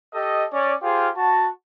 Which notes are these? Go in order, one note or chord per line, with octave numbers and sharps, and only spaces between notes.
G4 A4 D#5
C#4 D5
F4 G4 G#4 C5 F5
F#4 A5